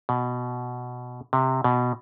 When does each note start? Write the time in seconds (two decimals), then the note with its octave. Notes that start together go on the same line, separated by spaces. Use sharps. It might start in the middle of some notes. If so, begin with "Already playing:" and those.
0.09 B2
1.33 C3
1.64 B2